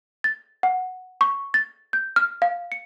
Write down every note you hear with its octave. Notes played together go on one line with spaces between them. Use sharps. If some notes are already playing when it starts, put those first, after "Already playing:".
A6
F#5
C#6
A6
G6
F6
F5
C#7